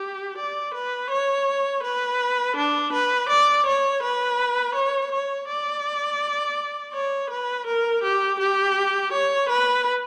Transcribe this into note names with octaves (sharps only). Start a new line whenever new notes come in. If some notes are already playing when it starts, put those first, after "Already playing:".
Already playing: G4
D5
B4
C#5
B4
D4
B4
D5
C#5
B4
C#5
C#5
D5
C#5
B4
A#4
G4
G4
C#5
B4